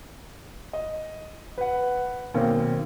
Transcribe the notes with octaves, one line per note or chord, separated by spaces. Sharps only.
D#5
B4 F#5
B1 D#3 A#3 C4